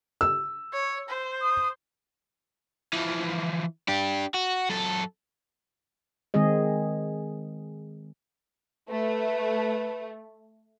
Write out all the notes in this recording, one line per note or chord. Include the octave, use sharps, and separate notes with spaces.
E6
C#5
C5
D#6
E3 F3
D4 G4
F#4
F#2 A4
D#3 G#3 C4 G#4 D#5
A3 B4